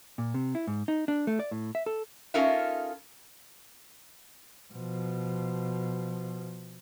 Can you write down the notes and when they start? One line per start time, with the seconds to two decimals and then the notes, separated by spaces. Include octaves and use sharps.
0.18 A#2
0.34 C3
0.55 E4
0.67 G#2
0.88 D#4
1.08 D4
1.27 A3
1.40 D5
1.51 A2
1.75 E5
1.86 A4
2.34 C#4 D#4 F4 A4 A#4 E5
4.73 B2 F3